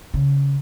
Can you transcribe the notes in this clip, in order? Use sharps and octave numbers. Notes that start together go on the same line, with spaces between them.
C#3